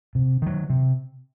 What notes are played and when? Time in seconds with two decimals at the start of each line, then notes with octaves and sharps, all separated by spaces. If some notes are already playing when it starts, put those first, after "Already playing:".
0.15 C3
0.42 D#3 F#3
0.70 C3